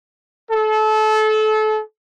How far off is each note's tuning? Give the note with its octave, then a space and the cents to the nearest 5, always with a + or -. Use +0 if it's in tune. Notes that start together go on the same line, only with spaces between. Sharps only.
A4 -30